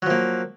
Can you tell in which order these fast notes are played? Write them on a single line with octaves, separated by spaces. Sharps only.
F#3 F3 A#3